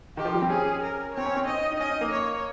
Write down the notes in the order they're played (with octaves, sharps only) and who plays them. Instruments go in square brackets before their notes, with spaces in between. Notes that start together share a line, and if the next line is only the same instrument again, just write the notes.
[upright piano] D#3 [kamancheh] G4
[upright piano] F3
G3
C4
[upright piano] C#4 [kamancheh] G#4
[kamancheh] A#4
[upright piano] C4 [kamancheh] C#5
[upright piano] C#4
C4
[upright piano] D#4 [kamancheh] D#5
[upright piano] D#4
[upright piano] C#4 [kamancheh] D#5
[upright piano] D#4
A#3
[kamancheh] C#5